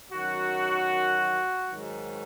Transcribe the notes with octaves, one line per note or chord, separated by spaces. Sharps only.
F#2 D#3 F#3 F#4
G#2 D#3 F#3